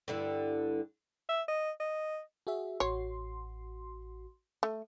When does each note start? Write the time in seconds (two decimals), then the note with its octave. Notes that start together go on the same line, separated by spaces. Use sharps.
0.08 G2 D3 E4
1.29 E5
1.48 D#5
1.80 D#5
2.47 F#4 G#4 E5
2.80 A1 F#4 C#5 C6
4.63 A3